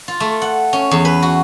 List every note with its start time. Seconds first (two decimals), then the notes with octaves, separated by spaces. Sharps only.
0.08 F4
0.20 A3
0.42 F#5
0.73 C#4
0.91 E2
1.05 B4
1.22 F#4